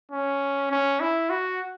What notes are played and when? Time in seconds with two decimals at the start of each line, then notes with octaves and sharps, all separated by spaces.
0.12 C#4
0.71 C#4
1.00 E4
1.29 F#4